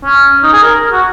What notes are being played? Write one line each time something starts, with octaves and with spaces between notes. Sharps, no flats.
C#4
D#4
G#4
A#4
F#4